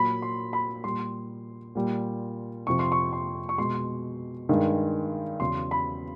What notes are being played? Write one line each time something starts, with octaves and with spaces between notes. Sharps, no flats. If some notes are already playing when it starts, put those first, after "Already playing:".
Already playing: A#2 F#3 B5
C6
B5
A#2 G3 C6
A#2 G3
F2 C3 F3 C#6
C6
C#6
C6
C#6
B2 G#3 C6
G2 D#3 G#3
E2 C#3 F#3 C6
B5